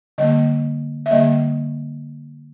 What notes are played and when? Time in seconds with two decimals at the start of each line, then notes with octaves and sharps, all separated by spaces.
0.18 D3 G3 A#3 D#5
1.06 E5
1.11 D3 G3 A#3 D#5